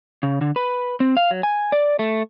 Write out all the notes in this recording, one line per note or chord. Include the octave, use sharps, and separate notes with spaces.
C#3
D3
B4
C4
F5
F#3
G#5
D5
A3